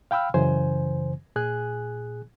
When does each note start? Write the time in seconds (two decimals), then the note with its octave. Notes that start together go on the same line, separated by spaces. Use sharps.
0.11 F5 G5 B5 E6 F6
0.34 F#2 C#3 E3 C5 G#5
1.36 A#2 G#4 G#5 F#6